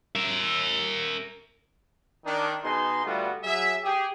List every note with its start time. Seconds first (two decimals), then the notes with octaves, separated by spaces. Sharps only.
0.15 A#4 E5
2.26 D#3 D4 D#4
2.64 B2 D#4 G#4 C6
3.05 D3 G3 A3 B3 F4 F#4
3.44 F#3 G#4 E5
3.83 G4 G#4